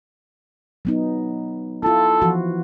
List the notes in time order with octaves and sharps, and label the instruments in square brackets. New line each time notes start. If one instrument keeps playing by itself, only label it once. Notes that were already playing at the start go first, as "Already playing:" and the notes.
[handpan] F#3 B3 D#4
[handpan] E4 F4 [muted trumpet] A4
[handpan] E3 F3 F#4